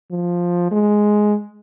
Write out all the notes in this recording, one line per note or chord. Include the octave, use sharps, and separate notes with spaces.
F3
G#3